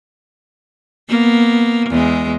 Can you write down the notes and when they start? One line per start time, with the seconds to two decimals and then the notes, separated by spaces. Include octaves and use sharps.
1.09 A#3 B3
1.89 E2 G#3